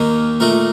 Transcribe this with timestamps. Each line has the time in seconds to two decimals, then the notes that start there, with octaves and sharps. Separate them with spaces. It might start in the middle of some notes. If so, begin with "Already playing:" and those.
Already playing: D#2 D#3 A#3 D#4
0.40 A#2 A3 D#4 A#4